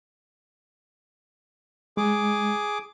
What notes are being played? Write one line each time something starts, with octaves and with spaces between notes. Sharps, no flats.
G#3 G#4 D6